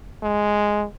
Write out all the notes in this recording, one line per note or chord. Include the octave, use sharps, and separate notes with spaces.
G#3